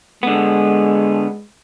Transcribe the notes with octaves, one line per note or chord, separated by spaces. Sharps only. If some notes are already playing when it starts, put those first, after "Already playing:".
D3 G#3 B3